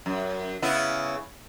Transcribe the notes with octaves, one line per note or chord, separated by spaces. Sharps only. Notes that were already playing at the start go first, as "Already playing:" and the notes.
F#2
C#3 B3 E4